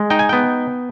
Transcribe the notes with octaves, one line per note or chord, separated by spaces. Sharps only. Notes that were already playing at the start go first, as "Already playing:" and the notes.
Already playing: G#3
D#4 G5
G#5
B3 G5